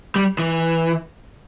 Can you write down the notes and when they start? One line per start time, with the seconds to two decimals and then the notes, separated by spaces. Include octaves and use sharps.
0.16 G3
0.39 E3